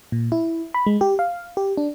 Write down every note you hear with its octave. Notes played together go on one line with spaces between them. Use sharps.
A#2
E4
B5
G#3
G4
F5
G4
D4